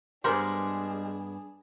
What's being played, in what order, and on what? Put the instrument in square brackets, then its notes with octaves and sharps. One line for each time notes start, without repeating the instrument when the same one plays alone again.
[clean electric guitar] G2 B3 [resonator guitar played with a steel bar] G3 G#3 [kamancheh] D4 G#4 [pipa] A#4 C5